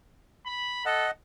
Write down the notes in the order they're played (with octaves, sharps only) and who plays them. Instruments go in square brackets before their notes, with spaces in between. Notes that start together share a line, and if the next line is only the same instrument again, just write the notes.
[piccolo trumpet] B5
[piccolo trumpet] A4 [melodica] D#5 F#5